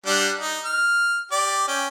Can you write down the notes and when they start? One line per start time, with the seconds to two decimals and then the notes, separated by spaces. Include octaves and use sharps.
0.06 G3 D4 F#5
0.40 D#4
0.65 F6
1.32 G4 D5
1.68 C#4 G5